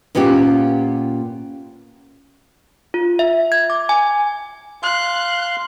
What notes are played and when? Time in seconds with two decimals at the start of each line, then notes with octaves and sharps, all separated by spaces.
0.15 A#2 B3 C#4 F4 G4
2.94 F4
3.19 E5
3.52 G#6
3.70 D6
3.89 G#5
4.83 F5 C6 F#6